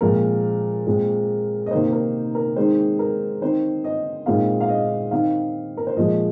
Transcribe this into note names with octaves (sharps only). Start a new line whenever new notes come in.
A#2 F3 G#3 C4 A#4
A#2 G#3 C4
D#5
C3 D#3 A#3 D#4 C5
A#4
A#4
D#3 G#3 C4 D#4 C5
A#4
D#3 C4 D#4 C5
D#5
A#2 G#3 C4 D#4 F5
F5
D#5
D#3 C4 D#4 F5
A#4
C5
A#2 F3 G#3 D#5